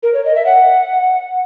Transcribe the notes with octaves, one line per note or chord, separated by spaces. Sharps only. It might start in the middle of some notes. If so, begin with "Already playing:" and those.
A#4
C#5
D#5
E5
F#5